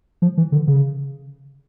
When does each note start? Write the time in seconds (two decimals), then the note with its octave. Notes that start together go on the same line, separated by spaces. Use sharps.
0.22 F3
0.37 E3
0.52 D3
0.67 C#3